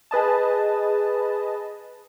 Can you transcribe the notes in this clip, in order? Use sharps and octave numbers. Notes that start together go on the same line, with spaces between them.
G#4 B4 D#5 A5